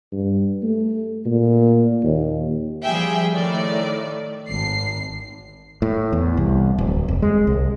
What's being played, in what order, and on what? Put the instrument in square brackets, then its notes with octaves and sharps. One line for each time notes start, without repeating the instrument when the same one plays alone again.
[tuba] G2
A3
A#2
D#2
[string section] F3 G3 G#4 E5 G5
A2 D#3 D5
G#1 C7
[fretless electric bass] A2
E2
C2
D1
F1
G#3
C2